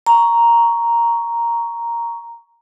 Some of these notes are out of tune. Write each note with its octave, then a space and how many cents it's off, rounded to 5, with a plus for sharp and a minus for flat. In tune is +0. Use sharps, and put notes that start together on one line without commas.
A#5 +0 C#6 +10